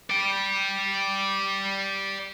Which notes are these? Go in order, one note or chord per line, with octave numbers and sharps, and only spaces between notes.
D5 G5